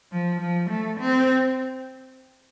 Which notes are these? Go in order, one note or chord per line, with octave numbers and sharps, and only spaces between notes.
F3
F3
A3
C4